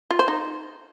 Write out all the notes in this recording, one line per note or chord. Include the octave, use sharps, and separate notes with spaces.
F4
C5
D#4